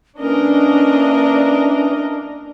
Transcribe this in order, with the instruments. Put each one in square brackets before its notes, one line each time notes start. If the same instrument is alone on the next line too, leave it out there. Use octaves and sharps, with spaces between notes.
[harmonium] E3 [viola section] A#3 A#4 D#5 [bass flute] C#4 [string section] D4